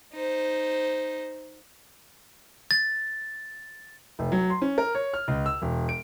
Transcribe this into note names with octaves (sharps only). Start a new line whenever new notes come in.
D#4 C5
A6
F1
F#3
C6
C#4
A#4
C#5
F6
C#2
E6
E1
D7